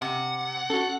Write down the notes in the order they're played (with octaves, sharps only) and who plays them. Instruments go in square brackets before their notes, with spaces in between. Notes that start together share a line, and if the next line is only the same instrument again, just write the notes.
[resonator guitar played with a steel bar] C3 [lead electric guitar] F#5
[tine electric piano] C#4 F#4 [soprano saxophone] A4